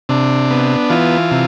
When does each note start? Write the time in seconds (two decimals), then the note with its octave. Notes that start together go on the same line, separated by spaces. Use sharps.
0.09 C3 D4
0.50 B3
0.90 E3 F4
1.31 C3